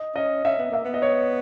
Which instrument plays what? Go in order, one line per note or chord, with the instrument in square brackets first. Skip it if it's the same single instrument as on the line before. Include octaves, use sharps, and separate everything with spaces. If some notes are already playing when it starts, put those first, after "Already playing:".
Already playing: [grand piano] D#5
[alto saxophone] C#4 [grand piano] D#5
[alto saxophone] C#4 [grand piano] E5
[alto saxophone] B3
[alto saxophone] A#3 [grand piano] E5
[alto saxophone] B3
[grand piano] D#5
C#5